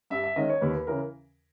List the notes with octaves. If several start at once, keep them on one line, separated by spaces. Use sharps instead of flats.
G2 E5
E5
D#3 G#3 C#4 D#5
C#5
D#2 B4
B4
C#3 E3 A#4